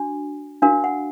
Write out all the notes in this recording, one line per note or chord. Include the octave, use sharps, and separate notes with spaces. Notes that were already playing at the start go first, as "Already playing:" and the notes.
Already playing: D4 F#4
D4 F#4 A#4 F5
F#5